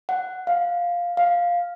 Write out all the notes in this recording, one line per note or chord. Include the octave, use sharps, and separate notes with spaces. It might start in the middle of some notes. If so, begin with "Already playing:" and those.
F#5
F5
F5